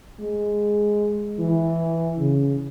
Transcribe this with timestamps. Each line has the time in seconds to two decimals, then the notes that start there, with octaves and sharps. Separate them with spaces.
0.20 G#3
1.39 E3
2.18 C#3